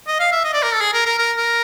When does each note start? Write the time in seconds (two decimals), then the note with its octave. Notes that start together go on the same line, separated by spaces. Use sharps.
0.07 D#5
0.19 F5
0.32 E5
0.44 D#5
0.53 D5
0.62 A#4
0.72 A4
0.81 G#4
0.93 A#4
1.06 A#4
1.18 A#4
1.37 A#4